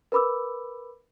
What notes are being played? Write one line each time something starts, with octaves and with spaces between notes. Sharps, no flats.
A#4 B4 B5 D6 E6